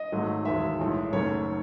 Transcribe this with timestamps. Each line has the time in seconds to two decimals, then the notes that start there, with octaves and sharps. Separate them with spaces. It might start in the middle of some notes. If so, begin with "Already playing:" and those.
Already playing: D#5
0.12 G#1 G#2 F#3 A3
0.45 E1 D#2 D#3 G#3 E5
0.79 B1 A2 E3 G#3
1.13 F#1 F#2 D#3 A3 C#5